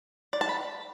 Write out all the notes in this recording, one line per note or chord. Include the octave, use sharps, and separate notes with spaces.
D5
A5
B5